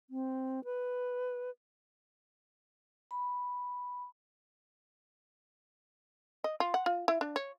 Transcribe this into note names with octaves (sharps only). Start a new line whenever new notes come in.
C4
B4
B5
D#5
F4
F#5
F4
E4
D4
C#5